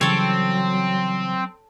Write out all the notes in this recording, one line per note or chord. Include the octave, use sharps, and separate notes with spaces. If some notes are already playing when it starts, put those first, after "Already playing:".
C#3 E3 F#3 G3 C4 A4 C#5